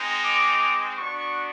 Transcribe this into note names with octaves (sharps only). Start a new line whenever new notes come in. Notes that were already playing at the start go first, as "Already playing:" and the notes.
Already playing: G#3 C4 D#4
D6
B3 D4 F#4 C#6